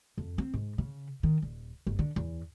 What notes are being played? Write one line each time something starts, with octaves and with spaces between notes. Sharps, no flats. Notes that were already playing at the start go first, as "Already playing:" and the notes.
F2
C4
G#2
C#3
D#3
D#1
G1
D3
E2